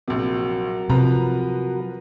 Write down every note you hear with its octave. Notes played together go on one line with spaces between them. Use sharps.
A#1 C3 F#3 F#4 A#4
C3 F3 B4 A#5